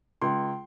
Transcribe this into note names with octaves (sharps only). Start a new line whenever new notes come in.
C#2 C6